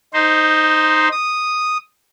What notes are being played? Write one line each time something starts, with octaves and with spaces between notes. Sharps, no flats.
D#4 C5
D#6